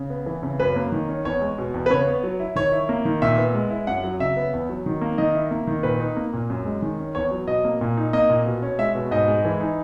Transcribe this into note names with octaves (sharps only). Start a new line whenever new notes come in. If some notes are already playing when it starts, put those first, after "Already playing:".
Already playing: C#3
B3
E3
C#3
F#2 B4
A#3
D#3
C#4
E2 C#5
G#3
B2
E2
B4
C#3 C#5
B3
F#3
E4
D#3 C#5
E4
A#3
D#3
A#2 E5
B3
G#3
E4
F#2 F#5
F#3
C#3 E5
B3
E2
F#3
D#3
A#3
D#3 D#5
E4
A#3
D#3
A#2 B4
D#4
A#3
A#2
F#2
G#3
D#3
C#4
E2 C#5
F#3
B2 D#5
A#3
A#2
D#4
A#3 D#5
A#2
B2
C#4
G#3 E5
B2
G#2 D#5
G#3
E3
D#4